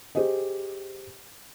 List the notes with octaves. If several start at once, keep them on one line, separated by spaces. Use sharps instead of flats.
G4 G#4 C5 D#5